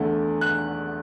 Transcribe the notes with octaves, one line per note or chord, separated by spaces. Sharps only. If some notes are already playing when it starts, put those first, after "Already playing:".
Already playing: E2 D3 A3
F#6